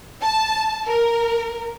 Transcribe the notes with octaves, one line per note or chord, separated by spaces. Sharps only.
A5
A#4